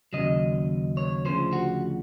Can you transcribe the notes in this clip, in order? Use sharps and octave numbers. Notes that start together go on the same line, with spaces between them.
D#2 C#3 F#3 D#5
C#5
D2 C#3 F3 C5
F#4